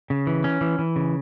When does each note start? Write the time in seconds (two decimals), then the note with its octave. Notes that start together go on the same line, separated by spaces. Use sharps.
0.10 C#3
0.27 E3
0.44 C#4
0.61 E3
0.79 E3
0.96 C#3